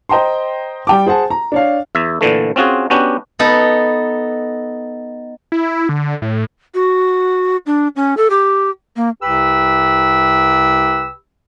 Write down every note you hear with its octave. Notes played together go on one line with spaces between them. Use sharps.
C5 D#5 G5 A#5 C6
G3 G5 D6
G#4 C5 F#5 A5
A#5
D4 C#5 F5
E2 E5
A#2 D3 E3 A3
C4 C#4 F4 F#4 G#4
B3 C#4 D4 F#4 G4
B3 D#4 A4 B4
E4
D3
A2
F#4
D4
C#4
A4
G4
A#3
C2 C3 G4 B4 B5 E6